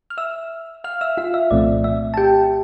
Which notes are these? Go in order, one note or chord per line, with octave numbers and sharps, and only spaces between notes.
F6
E5 E6
F5 F6
E5 E6
F4 F5
E5
C2 A#2 F3 A3 C4 D5
E5
A5
G4 G5